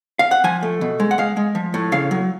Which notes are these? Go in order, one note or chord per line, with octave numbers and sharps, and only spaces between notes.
F5
F#5
F3 G#5
A3
B2
G#3
F#5
G#3 F5
G#3
F3
A2
C#3 F5
F#3